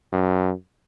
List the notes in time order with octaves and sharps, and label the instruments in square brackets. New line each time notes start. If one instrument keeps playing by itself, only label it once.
[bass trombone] F#2